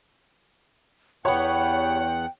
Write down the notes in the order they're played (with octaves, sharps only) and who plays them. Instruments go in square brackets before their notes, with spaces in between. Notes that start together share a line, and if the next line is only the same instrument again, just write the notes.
[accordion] E2 F#5 [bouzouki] B3 G4 [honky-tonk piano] C#5 [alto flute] G5